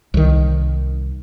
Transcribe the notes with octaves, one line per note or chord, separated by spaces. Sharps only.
C2 D#3